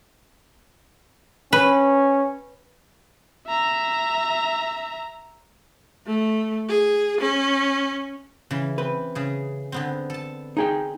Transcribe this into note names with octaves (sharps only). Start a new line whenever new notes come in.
C#4 B4
E5 A#5
A3
G#4
C#4
C#3 E3
C4 B4
C#3 G#4
D3 B3 C4
A4 A5
D#4 G#4 G5